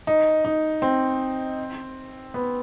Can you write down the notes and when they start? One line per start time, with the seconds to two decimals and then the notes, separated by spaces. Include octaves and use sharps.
0.07 D#4
0.45 D#4
0.82 C4
2.34 B3